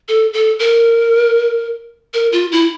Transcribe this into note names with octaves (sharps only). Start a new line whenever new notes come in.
A4
A4
A#4
A#4
F4
E4